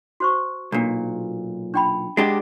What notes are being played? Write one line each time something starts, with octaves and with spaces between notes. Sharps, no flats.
F#4 C5 C#6
B1 A#2 D4
D4 G5 B5
G#3 D4 G4 D#5 F#5 A5